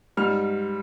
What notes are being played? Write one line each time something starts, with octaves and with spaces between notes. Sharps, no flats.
G#2 G3 F6